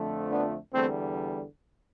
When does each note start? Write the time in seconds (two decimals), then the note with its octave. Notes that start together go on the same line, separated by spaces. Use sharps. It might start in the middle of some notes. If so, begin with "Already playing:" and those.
Already playing: F2 D3 F3 A3
0.30 B3 D4
0.73 E2 D3 G3 A3 C4